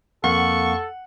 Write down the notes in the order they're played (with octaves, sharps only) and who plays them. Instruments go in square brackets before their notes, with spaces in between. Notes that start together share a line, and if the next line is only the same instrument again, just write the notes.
[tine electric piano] F2 A#3 F5 [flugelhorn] A4 [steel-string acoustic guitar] F#5 [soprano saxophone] C#6